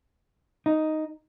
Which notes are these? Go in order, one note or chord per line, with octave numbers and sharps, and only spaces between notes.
D#4